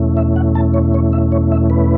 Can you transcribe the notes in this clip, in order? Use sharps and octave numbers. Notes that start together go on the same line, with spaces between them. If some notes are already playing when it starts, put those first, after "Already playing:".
Already playing: E2 B2 A3 C#4 E4
E5
F#5
A5
C#5
C#5
E5
C#5
E5
B4